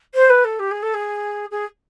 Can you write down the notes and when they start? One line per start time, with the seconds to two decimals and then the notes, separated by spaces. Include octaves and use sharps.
0.14 C5
0.29 B4
0.44 A4
0.59 G4
0.71 G#4
0.82 A4
0.94 G#4
1.51 G#4